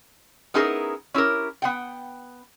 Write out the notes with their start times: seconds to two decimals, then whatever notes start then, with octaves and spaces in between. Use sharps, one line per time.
0.54 B3 C#4 D#4 E4 G#4 A#4
1.14 C#4 E4 G4 A#4
1.62 B3 F#5 G5